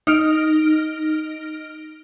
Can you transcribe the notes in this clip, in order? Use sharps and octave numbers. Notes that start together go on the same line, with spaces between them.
D#4 F6 D7